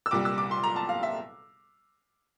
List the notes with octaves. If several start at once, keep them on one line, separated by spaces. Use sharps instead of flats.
E6
C2 A#2 G3 D6
E6
D6
C6
A#5
A5
F5
E5